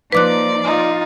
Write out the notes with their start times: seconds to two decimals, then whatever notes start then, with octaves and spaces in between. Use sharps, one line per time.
0.12 F3 A#3 D#4 B4 D5 D6 F#6
0.64 D#4 F4